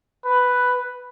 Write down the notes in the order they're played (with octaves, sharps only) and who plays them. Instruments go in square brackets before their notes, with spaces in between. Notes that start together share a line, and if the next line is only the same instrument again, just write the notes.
[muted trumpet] B4